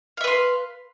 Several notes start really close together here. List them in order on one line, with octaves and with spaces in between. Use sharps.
F5 E5 B4 C6